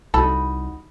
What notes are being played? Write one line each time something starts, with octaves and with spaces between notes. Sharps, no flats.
C2 D#4 F#4 A4 B5